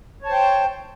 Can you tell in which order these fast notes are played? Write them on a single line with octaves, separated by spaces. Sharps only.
C#5 A5 C5 G5